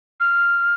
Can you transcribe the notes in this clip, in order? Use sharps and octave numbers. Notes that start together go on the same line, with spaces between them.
F6